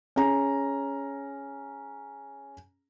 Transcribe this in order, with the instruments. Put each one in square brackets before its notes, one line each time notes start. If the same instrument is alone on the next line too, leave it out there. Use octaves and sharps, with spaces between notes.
[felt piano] C#4 G#4 A#5